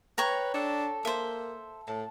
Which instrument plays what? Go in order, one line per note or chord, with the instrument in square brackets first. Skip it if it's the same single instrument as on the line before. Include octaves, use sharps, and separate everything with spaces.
[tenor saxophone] B4 [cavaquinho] C#5 G5 A#5
[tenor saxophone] D4 [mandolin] A4
[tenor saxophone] A#3 [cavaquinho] C5 E5
[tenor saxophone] A2 [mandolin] A5